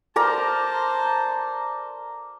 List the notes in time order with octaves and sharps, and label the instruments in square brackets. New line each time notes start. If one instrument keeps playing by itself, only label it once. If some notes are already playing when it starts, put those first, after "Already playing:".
[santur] A#4 D5 A#5 [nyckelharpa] C5 A5